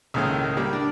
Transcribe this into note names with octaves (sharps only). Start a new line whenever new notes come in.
C#2 A2 D#3 G#3 A#3
G3 A#3
D4